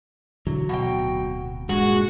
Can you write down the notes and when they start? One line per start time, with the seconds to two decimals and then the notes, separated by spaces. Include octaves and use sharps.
0.47 B2 D3 E3 F#3
0.69 D1 B2 G5
1.69 G2 A#2 G#3 F#4 G#4